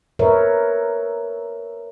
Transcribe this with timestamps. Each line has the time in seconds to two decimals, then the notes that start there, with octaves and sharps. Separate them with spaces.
0.19 A#4 B4 C#5 E5